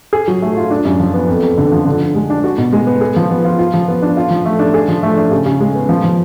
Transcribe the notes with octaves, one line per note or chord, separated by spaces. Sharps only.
G#4
F#3
A3
F4
D4
F#2
F3
B3
F2
F2
D3
F3
D3
D3
G#3
D4
F#4
B2
G#3
B3
G#4
F3
B3
F4
F4
F3
B3
D4
F4
F3
A3
D4
G#4
F3
A3
D4
C#3
C#3
G#3
B3
F3
F3